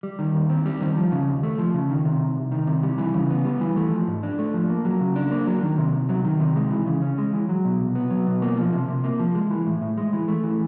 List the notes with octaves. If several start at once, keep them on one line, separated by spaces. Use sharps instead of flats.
G3
D#3
D#2
C4
G3
D#3
F3
C#3
D#2
A3
F3
C#3
D#3
C3
C2
C2
D#3
C3
G3
E3
C#3
B3
G3
E3
A3
F3
G#2
D4
A3
F3
A#3
F#3
C#3
D4
A#3
F#3
D#3
C3
C2
F#3
D#3
C3
G#3
E3
C#3
C#4
G#3
E3
F#3
B2
C2
B3
F#3
B2
A#3
F3
C3
C3
A#3
F3
G#3
E3
A2
A2
G#3
E3
A3
E3